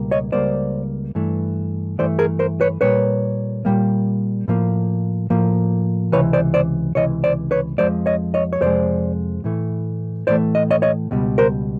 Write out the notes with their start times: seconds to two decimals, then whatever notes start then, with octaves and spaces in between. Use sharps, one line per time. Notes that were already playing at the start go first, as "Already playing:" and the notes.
Already playing: C#2 B2 G3 A#3
0.11 C#5 D#5
0.32 C#2 B2 G3 A#3 C5 D5
1.15 G2 E3 A3
1.99 G2 E3 A3 C5 D5
2.19 G#4 A#4
2.39 A#4 C5
2.61 B4 C#5
2.81 A#2 G3 A#3 B4 C#5
3.65 A#2 G3 A#3
4.48 A2 F3 A#3
5.30 A2 F3 A#3
6.12 C#2 C3 E3 B4 C#5
6.33 C5 D5
6.54 C5 D5
6.95 C#2 C3 E3 C#5 D#5
7.24 C5 D5
7.51 B4 C#5
7.78 F2 C3 F3 G#3 C5 D5
8.06 C#5 D#5
8.34 C#5 D#5
8.53 C#5
8.61 F2 C3 F3 G#3 C5 D5
9.44 A2 E3 A3
10.27 A2 E3 A3 C5 D5
10.55 D#5
10.71 C#5 D#5
10.82 C#5 D#5
11.11 C#2 B2 G3
11.38 A#4 C5